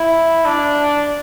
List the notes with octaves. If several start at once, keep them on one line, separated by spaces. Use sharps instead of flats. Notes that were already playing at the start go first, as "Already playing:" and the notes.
Already playing: E4
D4